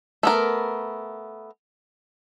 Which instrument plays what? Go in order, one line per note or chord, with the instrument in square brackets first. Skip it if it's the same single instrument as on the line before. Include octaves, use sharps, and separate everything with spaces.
[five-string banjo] A3 B3 A#4